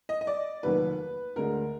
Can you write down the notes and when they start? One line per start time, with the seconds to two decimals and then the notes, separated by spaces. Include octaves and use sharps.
0.09 D#5
0.21 D#5
0.27 D5
0.63 F1 D#2 D#3 F#3 B4
1.36 D2 D3 G#3 A#4